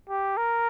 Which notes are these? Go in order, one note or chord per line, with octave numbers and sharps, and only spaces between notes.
G4
A#4